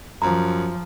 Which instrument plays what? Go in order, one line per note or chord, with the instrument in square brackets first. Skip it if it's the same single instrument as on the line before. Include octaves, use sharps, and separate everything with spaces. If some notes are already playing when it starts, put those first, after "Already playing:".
[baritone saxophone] F#2 [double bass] F3 [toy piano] A#5